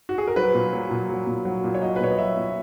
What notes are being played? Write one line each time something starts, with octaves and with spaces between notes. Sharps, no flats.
F#4
G#4
A#4
F#3 B4
A#2
F#3
A#2
F#3
A#2
F#3
A#2
C#5
F#3 D#5
B4
A#2 C#5
D#5
F#3 E5
A#2